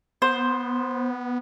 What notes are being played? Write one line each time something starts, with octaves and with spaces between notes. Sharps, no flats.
B3 C5